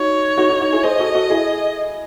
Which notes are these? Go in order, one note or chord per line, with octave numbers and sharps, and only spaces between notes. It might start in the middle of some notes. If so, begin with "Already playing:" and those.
Already playing: D#4 F#4 C#5
D#4 F#4
D#4 F#4
D#4 F#4
E4 G#4
G#4 C5 D#5
F#4 A4
F#4 A4
E4 G#4